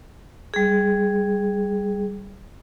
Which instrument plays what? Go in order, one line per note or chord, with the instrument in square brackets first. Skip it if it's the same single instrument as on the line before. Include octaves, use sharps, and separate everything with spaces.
[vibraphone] G3 G#4